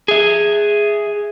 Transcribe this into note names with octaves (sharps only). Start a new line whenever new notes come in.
G#4 E5